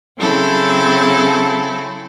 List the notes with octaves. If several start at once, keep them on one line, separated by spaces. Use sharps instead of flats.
C#3 F#3 C4 E4 A4